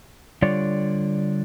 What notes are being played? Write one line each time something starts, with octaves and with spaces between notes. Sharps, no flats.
D3 G3 F4 C#5 D5